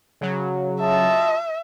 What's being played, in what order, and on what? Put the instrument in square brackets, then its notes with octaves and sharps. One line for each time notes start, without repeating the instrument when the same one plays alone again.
[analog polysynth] C#3 F#3
[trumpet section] F4 D#5 A5 [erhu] E5